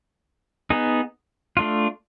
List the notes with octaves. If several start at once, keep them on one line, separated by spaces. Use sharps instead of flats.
B3 D#4 G#4
A3 D4 F4